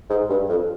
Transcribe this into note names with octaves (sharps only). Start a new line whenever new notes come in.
G#2
G2
F2